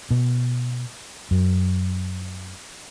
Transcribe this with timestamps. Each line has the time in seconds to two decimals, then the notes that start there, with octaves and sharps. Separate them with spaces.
0.11 B2
1.31 F#2